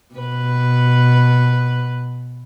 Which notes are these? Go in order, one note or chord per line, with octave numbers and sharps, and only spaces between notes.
B2 B4